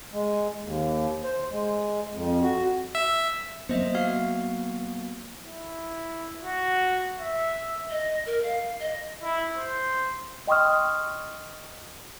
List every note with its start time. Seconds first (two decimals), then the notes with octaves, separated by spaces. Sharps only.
0.13 G#3
0.62 D#2
1.23 C5
1.51 G#3
2.12 F2
2.43 F#4
2.95 E5
3.69 F#3 A#3 B3 C5 D#5 E5
3.95 F#4 F5 F6
5.45 E4
6.43 F#4
7.19 E5
7.90 D#5
8.26 A#4
8.43 F5
8.80 D#5
9.23 E4
9.57 C5
10.47 D#5 G5 C6 C#6 D#6 F6